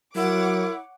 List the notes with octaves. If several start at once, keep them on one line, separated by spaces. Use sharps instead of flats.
F#3 E4 A#4 C#5 F#5 D6